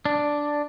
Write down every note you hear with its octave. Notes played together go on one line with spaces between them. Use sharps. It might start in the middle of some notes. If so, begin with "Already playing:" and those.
D4